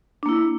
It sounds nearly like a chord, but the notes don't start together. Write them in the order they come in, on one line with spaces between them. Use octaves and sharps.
D4 A#3 E4